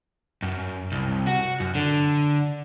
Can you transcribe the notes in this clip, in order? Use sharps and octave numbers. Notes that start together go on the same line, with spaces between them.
F#2
C2
F#4
F#2
D3